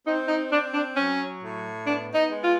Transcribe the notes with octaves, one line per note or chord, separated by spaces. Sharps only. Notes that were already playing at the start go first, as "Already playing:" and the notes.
C4 D#4
D#4
C4 D4
D4
F#3 C#4
A2
B3 D4
D#4
G#3
F4